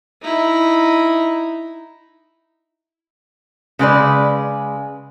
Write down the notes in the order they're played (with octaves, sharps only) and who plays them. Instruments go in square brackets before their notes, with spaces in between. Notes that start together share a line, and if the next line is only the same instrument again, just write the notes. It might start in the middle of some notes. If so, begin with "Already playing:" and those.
[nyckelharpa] D#4 E4
[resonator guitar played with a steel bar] C#3 G#3 B4 D5